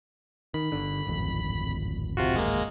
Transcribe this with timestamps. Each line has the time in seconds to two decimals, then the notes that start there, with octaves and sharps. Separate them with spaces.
0.54 D#3 B5
0.72 G1 D3
1.07 D1 G#1 F2
2.17 C3 F4 F#4
2.36 G#3 A#3